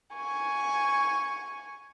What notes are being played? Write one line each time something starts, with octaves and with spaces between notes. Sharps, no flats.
G#5 C#6